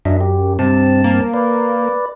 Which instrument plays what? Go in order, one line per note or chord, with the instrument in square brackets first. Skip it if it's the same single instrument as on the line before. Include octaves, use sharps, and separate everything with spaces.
[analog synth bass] F#2 [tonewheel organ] D4 D#5 E5
[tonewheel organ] G4
[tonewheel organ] G2 C4 A5 [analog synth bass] C3
[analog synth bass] A#3
[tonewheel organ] B4 D5